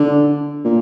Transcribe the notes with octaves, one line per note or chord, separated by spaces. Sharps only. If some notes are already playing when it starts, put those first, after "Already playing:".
Already playing: D3
A#2